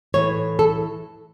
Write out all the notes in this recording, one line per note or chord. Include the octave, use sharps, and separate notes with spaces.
A2 E3 C#5
A4